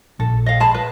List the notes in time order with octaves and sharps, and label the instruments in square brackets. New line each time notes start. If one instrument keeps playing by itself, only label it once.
[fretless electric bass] A#1 [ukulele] A4
[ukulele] D#5 F5
G#4 A5 B5
B4